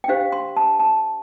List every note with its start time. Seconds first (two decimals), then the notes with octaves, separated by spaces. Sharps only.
0.04 G5
0.08 D4 G4 C5 F5
0.32 C6
0.56 A5
0.79 A5